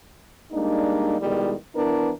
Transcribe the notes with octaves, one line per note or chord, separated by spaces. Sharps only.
G3 G#3 A#3 D4 D#4
E2 B2 D#3 E3 G3 G#3
E3 B3 D4 E4 A#4 B4